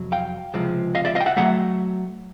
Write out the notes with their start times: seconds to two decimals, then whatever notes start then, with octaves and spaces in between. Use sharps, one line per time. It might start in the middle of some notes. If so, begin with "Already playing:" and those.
Already playing: F2 C3 F#3
0.12 F5 G5
0.54 C#2 C3 F3 G#3 C4
0.95 D#5 F5
1.05 D5 E5
1.15 D#5 F5
1.21 G5
1.26 E5 F#5
1.37 C#3 F#3 A3 E5 F#5